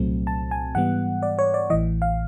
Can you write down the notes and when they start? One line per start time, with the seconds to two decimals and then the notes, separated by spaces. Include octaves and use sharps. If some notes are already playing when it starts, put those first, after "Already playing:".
Already playing: C2 A#2 F#3 A3 C4
0.27 A5
0.51 G#5
0.75 G#2 E3 G3 B3 F#5
1.23 D5
1.39 C#5
1.54 D5
1.70 A1 A2 E3 D#5
2.02 F5